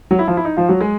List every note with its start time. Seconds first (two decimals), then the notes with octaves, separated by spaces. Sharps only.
0.11 F#3 F#4
0.19 E4
0.28 F3 F4
0.37 E4
0.45 D#4
0.57 F3 F4
0.69 F#3 F#4
0.80 G#3 G#4